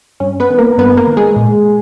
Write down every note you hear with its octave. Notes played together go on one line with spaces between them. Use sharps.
G2 C#4
B3 B4
D#3
A#3 A#4
G2 B3 B4
A#3 A#4
D#3
G#3 G#4
A#2